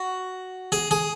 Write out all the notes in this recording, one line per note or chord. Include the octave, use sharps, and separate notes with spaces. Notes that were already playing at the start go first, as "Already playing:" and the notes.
Already playing: F#4
G#4
G#4